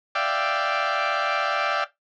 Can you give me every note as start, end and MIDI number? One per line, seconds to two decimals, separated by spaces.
0.15 1.84 74
0.15 1.84 76
0.15 1.84 77
0.15 1.84 79